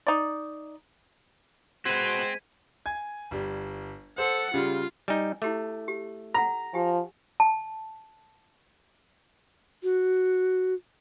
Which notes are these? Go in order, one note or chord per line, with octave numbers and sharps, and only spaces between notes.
D#4 D5
G#3 C4 F#4 B4 C5 G#6 B6 D#7
G#5 G#6
G1 G3
A4 C5 F#5
C#3 G3 F4
G3 D#4 G#5
A3 E4 G4 D6
G4
A4 F#5 A#5
F3 G4 G#5
A5
F#4